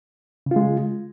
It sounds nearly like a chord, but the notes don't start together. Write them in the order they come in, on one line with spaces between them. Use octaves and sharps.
C#3 F4 G#3